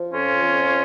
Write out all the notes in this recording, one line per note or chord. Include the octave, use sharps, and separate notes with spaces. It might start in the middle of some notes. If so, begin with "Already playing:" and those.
Already playing: F3
F2 C#4 F4
F2